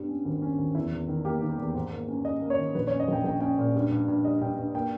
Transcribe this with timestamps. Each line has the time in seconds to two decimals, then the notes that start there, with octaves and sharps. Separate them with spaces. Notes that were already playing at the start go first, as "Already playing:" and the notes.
Already playing: G2 G3 B3
0.08 C#4
0.25 G#1
0.42 C#4
0.59 G#1
0.75 E2 E4
0.92 E2
1.08 D#3
1.25 A#3 G4
1.42 D#3
1.58 E2
1.75 G#2
1.92 A#3
2.08 C#4
2.25 C#4 D#5
2.41 A#3
2.50 C#5
2.58 D#3
2.75 A#1 B4
2.87 C#5
2.92 C#4
3.00 D#5
3.08 A#1 G5
3.24 A#1 G5
3.40 C#4 G5
3.58 A#2
3.75 G2
3.91 G2
4.08 G2
4.25 G3 D#5
4.41 G2 G5
4.58 G2
4.74 A#3 G5